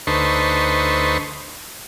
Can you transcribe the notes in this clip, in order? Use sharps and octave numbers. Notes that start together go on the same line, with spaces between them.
D2 D#4 A4 B4 C5 C#6